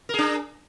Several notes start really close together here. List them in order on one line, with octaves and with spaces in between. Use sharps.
A#4 G#4 D4